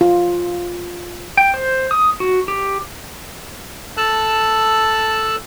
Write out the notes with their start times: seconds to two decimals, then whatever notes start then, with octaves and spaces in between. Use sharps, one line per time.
0.01 F4
1.37 G5
1.54 C5
1.91 D#6
2.20 F#4
2.48 G4
3.97 A4 A5 E6 F#6